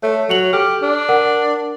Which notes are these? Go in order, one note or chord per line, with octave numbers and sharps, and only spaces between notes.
A3 C#5
F#3 C#7 F7 F#7
G4 A4 F6
D4
A#4 F#5